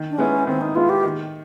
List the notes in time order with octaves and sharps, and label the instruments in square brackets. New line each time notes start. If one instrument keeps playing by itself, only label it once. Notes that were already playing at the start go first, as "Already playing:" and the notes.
Already playing: [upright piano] D#3
[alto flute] D4
[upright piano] G#3 B3 E4 [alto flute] C#4
[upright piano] D#3 [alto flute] C4
[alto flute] D#4
[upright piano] G#3 B3 E4 [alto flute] F4
[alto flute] G4
[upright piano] D#3